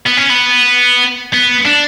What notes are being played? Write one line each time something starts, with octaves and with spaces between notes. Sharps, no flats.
B3
C#4
B3
B3
D4